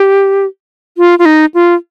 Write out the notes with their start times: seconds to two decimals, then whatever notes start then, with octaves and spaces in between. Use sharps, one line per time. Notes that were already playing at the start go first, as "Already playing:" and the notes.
Already playing: G4
0.98 F4
1.19 F4
1.25 D#4
1.54 F4